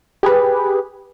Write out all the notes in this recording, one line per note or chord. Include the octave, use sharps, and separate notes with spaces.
G4 G#4 B4